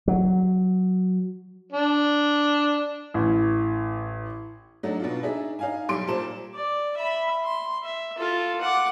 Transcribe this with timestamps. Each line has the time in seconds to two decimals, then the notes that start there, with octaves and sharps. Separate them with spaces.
0.08 F#3
1.72 D4
3.14 A1
4.83 F#3 A3 D4 D#4 F#4
5.00 B2 D4 F4
5.23 D4 D#4 G#4 E5
5.59 D#4 F5 G#5
5.89 B1 G3 C6 D7
6.07 A#2 G3 C5 A5 E7
6.54 D5
6.97 E5 B5
7.44 C6
7.84 E5
8.18 F4 A4
8.61 F#5 D6